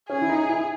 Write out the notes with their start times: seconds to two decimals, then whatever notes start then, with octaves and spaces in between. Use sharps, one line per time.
0.09 C#4 G#4
0.22 E4
0.29 D#4
0.49 E4